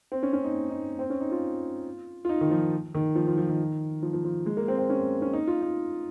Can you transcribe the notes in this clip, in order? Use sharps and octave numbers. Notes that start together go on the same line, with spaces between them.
C4
C#4
C#4
D#4
D#4
C4
C#4
D#4
F4
F4
D#4
D#3
F3
D#3
F3
F3
F3
D#3
F3
F3
F3
G#3
A#3
C4
C4
C#4
C#4
D#4
F4
D#4